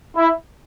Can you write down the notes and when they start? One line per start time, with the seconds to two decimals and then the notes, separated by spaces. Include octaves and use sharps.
0.17 E4